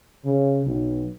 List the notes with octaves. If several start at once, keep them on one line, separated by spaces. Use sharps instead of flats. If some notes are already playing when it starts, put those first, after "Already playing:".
C#3
B1